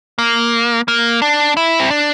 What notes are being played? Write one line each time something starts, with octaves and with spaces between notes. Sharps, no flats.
A#3
A#3
D4
E4
C4
D4